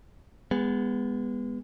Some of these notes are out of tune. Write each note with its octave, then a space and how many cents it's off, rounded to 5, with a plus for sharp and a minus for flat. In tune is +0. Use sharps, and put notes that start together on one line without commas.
G#3 -25 B3 +0